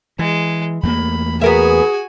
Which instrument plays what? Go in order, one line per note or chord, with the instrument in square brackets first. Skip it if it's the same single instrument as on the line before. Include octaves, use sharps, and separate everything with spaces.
[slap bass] E3 [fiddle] G#3
[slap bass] E2 A3 A#3 [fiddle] B5
[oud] B3 A#4 E5 [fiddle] F#4 G#5 [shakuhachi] G#4